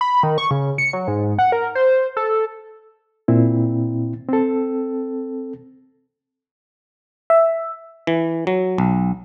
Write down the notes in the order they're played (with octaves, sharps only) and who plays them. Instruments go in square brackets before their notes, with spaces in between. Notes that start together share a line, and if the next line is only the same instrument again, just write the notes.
[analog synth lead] B5
D#3
C#6
C#3
C#7
F#3
G#2
F#5
A#4
C5
A4
[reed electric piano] A#2 C4 E4
C4 A4
[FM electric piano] E5
[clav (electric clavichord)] E3
F#3
B1